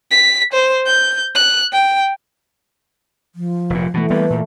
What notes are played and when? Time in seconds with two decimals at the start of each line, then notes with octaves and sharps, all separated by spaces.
0.11 B6
0.53 C5
0.87 G6
1.35 F#6
1.72 G5
3.35 F3
3.70 F1 A#2
3.94 B2 E3 A3
4.10 G3 A#3 B3 B4
4.30 A#2